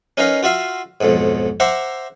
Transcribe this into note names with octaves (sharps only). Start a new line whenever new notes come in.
C#4 D#4 A#4 B4 D#5 F5
F4 F#4 E5 F5
B1 F2 G#2
C5 E5 F#5 A#5 C6 D6